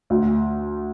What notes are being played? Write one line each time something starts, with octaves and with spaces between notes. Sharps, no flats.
D2